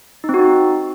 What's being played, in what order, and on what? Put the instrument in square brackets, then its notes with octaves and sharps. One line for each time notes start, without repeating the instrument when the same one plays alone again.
[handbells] D#4
C4
F#4
D#4